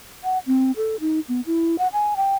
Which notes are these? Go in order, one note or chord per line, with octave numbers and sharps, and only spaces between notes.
F#5
C4
A4
D#4
B3
E4
F#5
G#5
G5